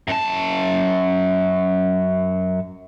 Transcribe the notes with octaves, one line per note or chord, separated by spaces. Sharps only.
F#2 A5